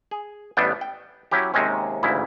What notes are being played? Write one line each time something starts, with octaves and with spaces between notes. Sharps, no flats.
G#4
A1 G3 A3 B3 D4 G5
G5
F#3 C#4 E4 G4
D#2 C3 D#3 G#3 C4 C#4
A1 D2 G#2 C#3 E4